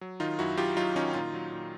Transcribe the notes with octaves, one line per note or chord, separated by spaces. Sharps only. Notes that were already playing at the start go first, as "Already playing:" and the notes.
F#3
D#3 D#4 F4
F#2 E4 F#4
F#2 F4 G4
F#3 D#4 F4
D#3 C#4 D#4
A#2 D#4 F4
F#3
A#2